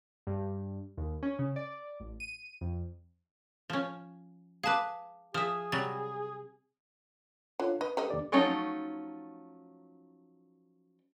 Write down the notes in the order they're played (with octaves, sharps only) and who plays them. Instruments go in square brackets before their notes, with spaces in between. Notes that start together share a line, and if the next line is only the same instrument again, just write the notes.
[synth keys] G2
D#2
C#4
C#3
D5
A1
D#7
F2
[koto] F3 C#4
[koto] G#4 B4 [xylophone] F5 A5 D6
[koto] F3 E5 [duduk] G#4 [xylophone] D#6 F6
[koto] C3 F#3 G3 [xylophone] A6
[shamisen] D3 [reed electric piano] F4 C#5
[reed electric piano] B4 [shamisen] D#5
[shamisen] G3 A4 D#5
[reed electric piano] D#2 D4 D5
[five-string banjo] F3 F#3 A3 C#4 D#4